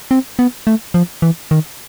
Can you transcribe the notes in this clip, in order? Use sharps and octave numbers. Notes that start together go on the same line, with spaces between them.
C4
B3
A3
F3
E3
D#3